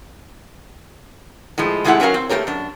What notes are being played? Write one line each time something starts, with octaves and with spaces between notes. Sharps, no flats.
A2 F3 G#3
C3 G#3 A3 E4 G4 F#5
F#3 C#4 F#4 A#4 F5
C4
A3 A#3 G4 A#4 C#5
F#2 D4